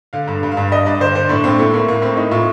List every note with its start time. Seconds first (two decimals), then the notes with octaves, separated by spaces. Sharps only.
0.13 D3 F5
0.27 G2
0.43 G2
0.52 F5
0.57 G2
0.71 G2 D#5
0.86 G2 D5
1.00 D3 C5
1.15 D3 C5
1.29 A2 D4
1.44 A2 C4
1.59 A2 A3
1.73 A2 A#3
1.88 A2 A#3
2.02 A2 C4
2.17 A2 D#4
2.31 A2 F4